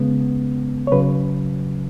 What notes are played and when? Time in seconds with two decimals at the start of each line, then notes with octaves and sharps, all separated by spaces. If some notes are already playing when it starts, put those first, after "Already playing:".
Already playing: C#3 G#3 B3
0.87 C#5
0.92 C#3 F#3 B4